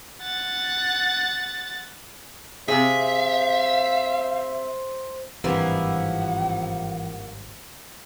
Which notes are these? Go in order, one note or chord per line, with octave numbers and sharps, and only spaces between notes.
F#5 A6
C3 G#4 C5 E5 F5
G#1 G2 C3 E3 F3 A#3 E4 F#5